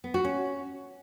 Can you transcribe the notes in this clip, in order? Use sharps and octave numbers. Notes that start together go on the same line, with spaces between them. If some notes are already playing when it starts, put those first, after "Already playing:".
B3
F#4
C#4